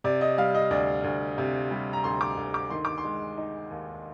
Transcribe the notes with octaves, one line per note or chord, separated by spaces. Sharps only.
C3 D5
D#5
G3 F5
D#5
D2 D5
D2
C3
G3
A#5
D2 C6
D6
D2
D6
D#3 C6
D6
C6
G#3
D#4
D#2